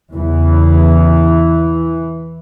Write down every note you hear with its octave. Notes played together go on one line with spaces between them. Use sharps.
E2 C#3 E3